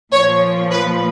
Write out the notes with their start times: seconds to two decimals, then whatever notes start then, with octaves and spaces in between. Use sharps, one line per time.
0.12 A#2 F3 C#5
0.71 B4